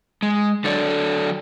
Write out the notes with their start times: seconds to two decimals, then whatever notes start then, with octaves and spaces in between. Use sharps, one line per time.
0.22 G#3
0.64 D3 F#3 A4 D5